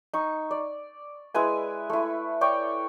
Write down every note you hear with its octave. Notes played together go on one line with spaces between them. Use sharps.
D#4 C#6
D5
G#3 E4 B4 G#5
A3 E4
C#5 D5 G5 C#6